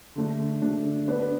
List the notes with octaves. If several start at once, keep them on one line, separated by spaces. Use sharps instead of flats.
D3 A3 D4
D3 A3 D4
B3 D4 B4 D5